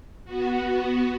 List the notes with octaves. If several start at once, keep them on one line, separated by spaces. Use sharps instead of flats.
B3 F#4